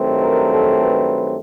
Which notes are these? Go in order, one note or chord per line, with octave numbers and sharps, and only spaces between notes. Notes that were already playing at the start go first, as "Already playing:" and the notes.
Already playing: G2 D#3 F#3 A3 C4
A#4
A4
B4